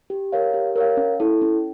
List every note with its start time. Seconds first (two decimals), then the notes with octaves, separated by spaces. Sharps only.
0.10 G4
0.32 A#4 C#5 F5
0.54 G4
0.76 A#4 C#5 F5
0.97 C#4
1.20 E4 A4
1.42 C#4